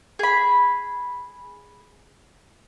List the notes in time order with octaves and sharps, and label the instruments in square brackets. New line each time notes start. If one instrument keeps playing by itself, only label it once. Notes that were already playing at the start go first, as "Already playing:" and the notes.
[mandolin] G#4 B5